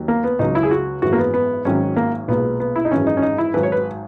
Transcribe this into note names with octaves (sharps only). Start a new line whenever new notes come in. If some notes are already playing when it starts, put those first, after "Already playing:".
Already playing: D#2 D#3 F#3
A#3
B3
C#2 C#3 F#3 D#4
E4
G#4
F#4
G#1 F#2 E3 G#3 F#4
A#3
B3
B3
G#1 G#2 D#3 F#3 C#4
A#3
B1 A#2 G#3 B3
B3
E4
D#4
G#1 F#2 E3 G#3 C#4
D#4
C#4
D#4
E4
G#1 G#2 F#3 B4
C#5
B4